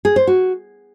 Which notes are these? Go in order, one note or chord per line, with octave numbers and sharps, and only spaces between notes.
G#4
C5
F#4